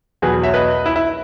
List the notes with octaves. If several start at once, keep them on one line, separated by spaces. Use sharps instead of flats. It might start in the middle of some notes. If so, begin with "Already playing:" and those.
E2 B2 F#3 G#4 B4
C#5 E5
B4 D#5
E4
E4